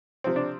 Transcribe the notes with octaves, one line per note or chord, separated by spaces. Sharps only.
C3 F3 C4
D4